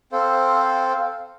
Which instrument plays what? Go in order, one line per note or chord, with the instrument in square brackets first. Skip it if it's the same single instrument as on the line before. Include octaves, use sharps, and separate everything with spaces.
[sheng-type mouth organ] C4 A4 C5 [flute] F5